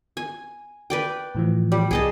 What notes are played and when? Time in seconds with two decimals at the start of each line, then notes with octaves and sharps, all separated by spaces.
0.17 G#5
0.90 B4 D5 G5
1.35 A2 E3 F3
1.72 G3
1.91 C2 G#4 D#5 A5